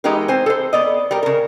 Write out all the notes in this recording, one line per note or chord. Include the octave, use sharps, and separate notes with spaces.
E3 G#3 B3 D#4 G4 A#4
C4 C5 G#5
A4 C5
B3 D5 D#5
G3 A#4
C#3 A#4